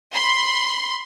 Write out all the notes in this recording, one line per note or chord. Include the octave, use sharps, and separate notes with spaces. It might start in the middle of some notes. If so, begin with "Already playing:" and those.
B5 C6